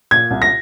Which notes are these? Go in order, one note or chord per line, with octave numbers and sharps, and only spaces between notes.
A#2 G#6
C2
A#6